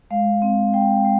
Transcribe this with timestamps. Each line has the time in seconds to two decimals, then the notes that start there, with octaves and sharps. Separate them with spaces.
0.11 G#3 F5
0.42 C4
0.74 G#3 G5
1.05 G#3